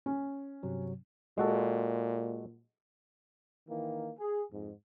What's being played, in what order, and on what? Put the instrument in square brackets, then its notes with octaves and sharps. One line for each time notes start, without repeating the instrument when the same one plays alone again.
[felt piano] C#4
[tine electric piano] G2 C3 F#3
[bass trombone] A#2 [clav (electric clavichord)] G#3 F#4 A4
[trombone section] D#3 E3 A#3
G#4
F2 G#2